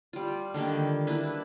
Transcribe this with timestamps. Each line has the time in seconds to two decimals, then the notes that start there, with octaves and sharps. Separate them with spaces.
0.13 G3 F4
0.54 D3 D#3 G3 A#3
1.07 A#3 D4 E4 B4